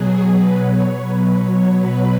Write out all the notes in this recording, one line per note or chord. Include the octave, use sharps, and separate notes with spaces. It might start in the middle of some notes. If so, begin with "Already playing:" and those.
Already playing: B2 F#3 G#4
B4
C#5
B2 F#3 B4
C#5
B4